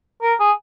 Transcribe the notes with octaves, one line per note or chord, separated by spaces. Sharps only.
A#4
G#4